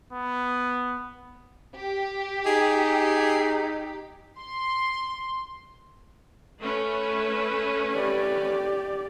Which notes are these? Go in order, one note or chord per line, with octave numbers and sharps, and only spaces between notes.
B3
G4
D#4 G#4
C6
A3 C#4 B4
G4 D5